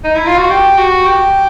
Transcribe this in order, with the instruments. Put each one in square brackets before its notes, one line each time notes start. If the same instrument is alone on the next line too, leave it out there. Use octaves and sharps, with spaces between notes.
[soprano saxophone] D#4
E4
F4
F#4
G4
F#4
G4